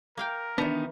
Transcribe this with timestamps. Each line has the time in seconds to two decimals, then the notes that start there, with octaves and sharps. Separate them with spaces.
0.17 A#3 A#4 F5 G5
0.58 D#3 E3 B3 D4 A#5